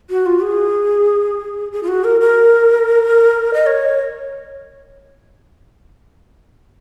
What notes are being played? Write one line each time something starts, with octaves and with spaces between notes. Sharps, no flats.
F#4
F4
G#4
G#4
F4
F#4
A#4
A#4
D#5
C#5